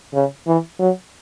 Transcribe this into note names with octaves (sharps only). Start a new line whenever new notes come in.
C#3
E3
F#3